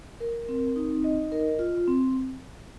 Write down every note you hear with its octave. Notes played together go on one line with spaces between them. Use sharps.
A#4
C4
D#4
D#5
A#4
F4
C4